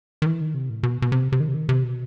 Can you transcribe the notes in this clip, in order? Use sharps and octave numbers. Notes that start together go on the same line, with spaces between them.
D#3
E3
D#3
C3
A2
B2
B2
C3
C3
D#3
C3
D#3
C3
B2